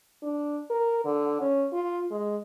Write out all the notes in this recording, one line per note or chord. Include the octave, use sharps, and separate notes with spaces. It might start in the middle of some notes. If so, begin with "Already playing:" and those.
D4
A#4
D3
C#4
F4
G#3